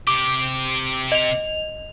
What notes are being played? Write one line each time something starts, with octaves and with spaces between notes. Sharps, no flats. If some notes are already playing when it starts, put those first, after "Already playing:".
C3 G4 D6
D#5 F7